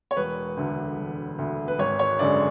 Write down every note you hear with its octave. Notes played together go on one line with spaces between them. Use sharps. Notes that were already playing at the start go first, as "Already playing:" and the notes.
C#5
E1 B4
D2 D3
E1
D2 D3
B4
G#1 C#5
C#5
F#2 D3 G#3 D5